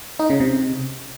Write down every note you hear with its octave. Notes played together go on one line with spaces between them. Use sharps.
D#4
C#3
C3